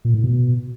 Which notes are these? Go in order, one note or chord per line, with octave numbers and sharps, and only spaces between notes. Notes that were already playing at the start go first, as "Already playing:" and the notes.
A#2
A2
B2